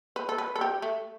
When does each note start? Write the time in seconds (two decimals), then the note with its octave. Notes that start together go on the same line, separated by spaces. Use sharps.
0.16 B4
0.29 A4
0.38 B4
0.56 A4
0.61 G4
0.82 A3